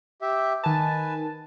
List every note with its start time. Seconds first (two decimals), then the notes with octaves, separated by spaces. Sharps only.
0.22 G4 E5
0.64 D#3 B4 G#5 A5